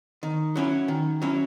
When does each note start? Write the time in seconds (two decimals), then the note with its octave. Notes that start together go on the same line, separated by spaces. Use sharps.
0.23 D#3
0.56 F#3 C#4 E4
0.88 D#3
1.22 F#3 C#4 E4